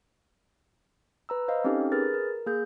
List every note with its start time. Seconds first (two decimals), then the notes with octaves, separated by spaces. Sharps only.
1.29 B4 A#5 E6
1.48 C5 D#5 F5
1.64 C4 C#4 D#4 G4 A4
1.92 G#4 A#4 B4 F6 A6
2.14 A#4
2.46 A#3 G#4 G6